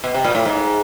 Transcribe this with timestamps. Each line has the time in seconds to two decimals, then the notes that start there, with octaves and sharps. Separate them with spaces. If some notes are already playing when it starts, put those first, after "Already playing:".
0.04 B2
0.14 C3
0.25 A#2
0.35 A2
0.45 G#2